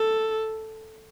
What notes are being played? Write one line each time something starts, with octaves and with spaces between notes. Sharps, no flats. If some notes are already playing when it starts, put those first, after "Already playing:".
Already playing: A4